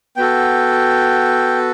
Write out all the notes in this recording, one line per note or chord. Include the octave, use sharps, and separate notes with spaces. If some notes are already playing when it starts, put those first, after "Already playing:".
B3 F#4 A4 G5